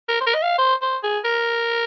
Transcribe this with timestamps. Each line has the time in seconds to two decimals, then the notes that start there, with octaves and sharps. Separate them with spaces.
0.09 A#4
0.21 C5
0.26 A#4
0.34 D#5
0.42 F5
0.58 C5
0.81 C5
1.03 G#4
1.24 A#4